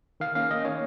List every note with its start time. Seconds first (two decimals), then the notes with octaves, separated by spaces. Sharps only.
0.20 D#3 F5
0.35 A#3 C#4 F5
0.50 D#3 D#5
0.65 A#3 C#4 C#5